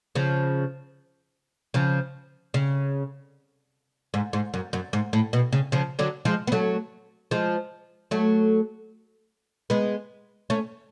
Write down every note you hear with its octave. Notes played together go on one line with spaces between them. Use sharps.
C#3 F3
C#3 F3
C#3
G#2
G#2
F#2
F#2
G#2
A2
B2
C#3
C#3 F3
D3 F#3
F3 G#3
B3
F#3 A3
F3 G#3
F#3 A3
G#3 B3
A3 C#4